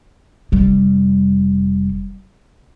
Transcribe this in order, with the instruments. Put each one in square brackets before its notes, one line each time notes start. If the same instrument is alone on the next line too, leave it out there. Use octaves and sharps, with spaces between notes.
[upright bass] F1 G3